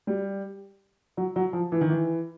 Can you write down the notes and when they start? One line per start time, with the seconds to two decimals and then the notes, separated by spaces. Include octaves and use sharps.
0.07 G3
1.17 F#3
1.36 F#3
1.53 F3
1.72 E3
1.81 D#3
1.90 E3